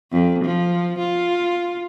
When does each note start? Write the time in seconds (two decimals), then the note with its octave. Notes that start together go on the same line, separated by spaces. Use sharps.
0.12 F2
0.45 F3
0.99 F4